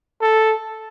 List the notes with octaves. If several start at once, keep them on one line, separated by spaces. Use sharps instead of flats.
A4